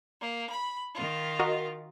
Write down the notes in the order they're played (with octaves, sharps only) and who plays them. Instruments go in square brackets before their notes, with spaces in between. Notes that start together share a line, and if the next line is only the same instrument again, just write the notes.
[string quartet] A#3
B5
D#3 F4
[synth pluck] F#4 A#4 D#5